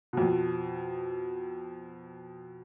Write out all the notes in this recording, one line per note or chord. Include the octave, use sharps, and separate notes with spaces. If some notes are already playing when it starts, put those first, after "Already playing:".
F2 B2